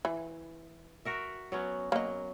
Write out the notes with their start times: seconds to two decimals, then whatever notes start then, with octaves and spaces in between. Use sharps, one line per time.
0.05 E3
1.05 F#4 A#4 E5
1.52 F#3 B3 C#4
1.92 F#3 A#3 D#5